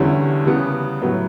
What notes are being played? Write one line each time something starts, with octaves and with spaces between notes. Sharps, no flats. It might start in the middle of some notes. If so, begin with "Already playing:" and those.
Already playing: E2 D3 G3 C#4 E4
C#3 E3 G3 B3
A2 F#3 B3